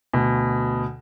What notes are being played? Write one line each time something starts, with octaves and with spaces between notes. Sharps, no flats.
D2 B2